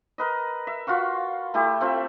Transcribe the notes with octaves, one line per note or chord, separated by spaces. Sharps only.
A#4 B4 D#5
E5
F4 F#4 F5 C#6
A3 E4 G4
A3 C4 F4 E5